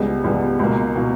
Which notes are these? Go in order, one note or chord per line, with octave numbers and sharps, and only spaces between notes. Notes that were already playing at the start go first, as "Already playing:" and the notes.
Already playing: C#2 C#3 G3 B3
C#2 C#3 G3 B3
C#2 B2 A#3
B2 A#3